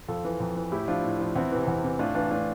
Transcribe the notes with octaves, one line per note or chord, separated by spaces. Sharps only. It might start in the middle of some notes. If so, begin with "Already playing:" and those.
F2 F4 A4
E3
F2
E3
A2 E4 G4
F3 D4 F4
A2
F3
E2 C4 E4
C3 E3
E2
C3 E3
A2 D4 F4
E3 D4 F4
A2 D4 F4